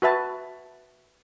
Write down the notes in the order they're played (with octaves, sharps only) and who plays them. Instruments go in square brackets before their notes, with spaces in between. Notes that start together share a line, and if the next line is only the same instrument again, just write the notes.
[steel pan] F#4 B4 E5 A5